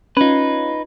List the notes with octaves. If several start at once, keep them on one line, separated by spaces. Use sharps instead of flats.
C#4 D#4 F4 B4